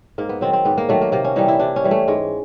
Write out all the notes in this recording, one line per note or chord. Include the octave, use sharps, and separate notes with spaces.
G#2 A#3
B3
D#3 F#3 C4
C4
G#2 B3
A#3
D#3 F#3 A3
A#3
C3 A#3
C#4
E3 G3 D#4
E4
C3 D4
C#4
E3 G3
A3
G#2 G#3